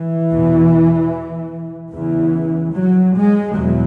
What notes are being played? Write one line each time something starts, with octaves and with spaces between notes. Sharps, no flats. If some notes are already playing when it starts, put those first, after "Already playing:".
Already playing: E3
E2 B2
E2 C#3 E3
F#3
G#3
E2 B2 F#3